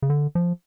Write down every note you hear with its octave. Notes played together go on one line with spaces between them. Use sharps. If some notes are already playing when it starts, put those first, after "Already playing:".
C#3
D3
F3